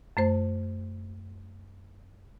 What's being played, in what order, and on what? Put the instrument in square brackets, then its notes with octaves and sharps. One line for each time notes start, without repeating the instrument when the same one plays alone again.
[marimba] F#2 A3 C5